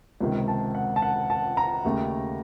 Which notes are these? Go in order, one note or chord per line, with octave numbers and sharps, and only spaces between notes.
C#2 C3 D#3
A5
F#5
A5
F#5
A5
A#5
D#2 C#3 A3